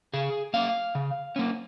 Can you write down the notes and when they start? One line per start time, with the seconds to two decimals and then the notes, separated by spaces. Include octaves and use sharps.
0.14 C#3 G#4
0.54 A#3 C#4 F5
0.95 C#3
1.36 A#3 C#4